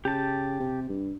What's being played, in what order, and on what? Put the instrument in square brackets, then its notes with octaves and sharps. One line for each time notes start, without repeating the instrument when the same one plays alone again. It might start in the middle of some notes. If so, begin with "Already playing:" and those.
[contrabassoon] C#3 [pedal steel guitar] G4 A5
[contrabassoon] C3
G2